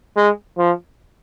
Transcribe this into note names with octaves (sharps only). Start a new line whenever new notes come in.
G#3
F3